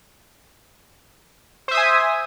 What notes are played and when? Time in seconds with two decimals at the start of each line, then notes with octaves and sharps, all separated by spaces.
1.68 C5
1.71 E5
1.74 D#6
1.77 G#5